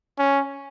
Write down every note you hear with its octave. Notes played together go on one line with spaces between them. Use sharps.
C#4